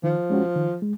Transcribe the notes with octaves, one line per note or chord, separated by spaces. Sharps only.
D#3 F3
G#3 C#4 F#4
D#3
G#3